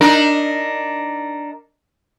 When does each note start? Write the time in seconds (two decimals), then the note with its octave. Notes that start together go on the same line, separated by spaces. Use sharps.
0.01 D4 D#4 A#4